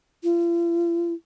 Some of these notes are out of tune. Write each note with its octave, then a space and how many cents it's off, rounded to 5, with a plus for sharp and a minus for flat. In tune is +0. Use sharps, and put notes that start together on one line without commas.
F4 -45